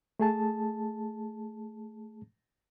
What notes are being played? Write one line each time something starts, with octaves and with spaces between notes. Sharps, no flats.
A3 G#4 A5